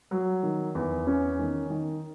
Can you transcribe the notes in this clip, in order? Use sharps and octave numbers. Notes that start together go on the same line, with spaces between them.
F#3
D#3
E2
C#4
D#3
D#3